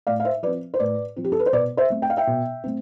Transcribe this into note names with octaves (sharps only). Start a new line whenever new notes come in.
A2 D5 F5
F5
C5 E5
F3 C4 B4 D5
C5
A2 B4 D5
F3 C4
G4
A4
B4
C5
B2 B4 D5
C5 E5
A3 C4
G5
F5
E5 G5
B2
A3 C4